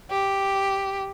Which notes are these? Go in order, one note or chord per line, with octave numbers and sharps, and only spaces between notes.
G4